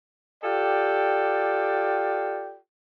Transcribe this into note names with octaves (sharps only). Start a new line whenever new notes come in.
F4 G4 A4 D5 G5